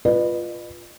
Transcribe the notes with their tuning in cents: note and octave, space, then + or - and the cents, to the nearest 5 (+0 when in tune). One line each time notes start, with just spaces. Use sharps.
F4 +0 B4 -5 D#5 -45